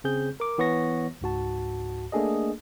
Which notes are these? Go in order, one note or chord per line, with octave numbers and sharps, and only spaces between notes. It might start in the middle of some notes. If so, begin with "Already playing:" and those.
C#3 C4 G#4 G6
A#4 D6
E3 B3 C#5 C#6 A#6
C#2 G#2 F#4 A5
A3 A#3 D4 G#4 A4 D#5